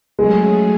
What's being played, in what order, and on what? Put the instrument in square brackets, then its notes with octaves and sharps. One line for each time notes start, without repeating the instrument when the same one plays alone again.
[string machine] F#3 A3 C#4 G#4 [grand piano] G#3